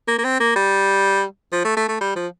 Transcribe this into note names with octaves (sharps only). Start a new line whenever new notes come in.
A#3
A#3
C4
A#3
G3
F3
A3
A3
A3
G3
F3